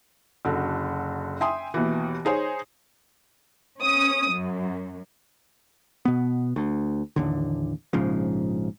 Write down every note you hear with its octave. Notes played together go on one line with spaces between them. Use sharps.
F#1 D3 F#4 A4
E5 G5 G#5 C6 D#6
D#2 B2 E3
D#4 G#4 C5 C#5
C#4 D#6
F#2
B2 B3
D2
A1 D#2 D3
A#1 G#2 C#3 F3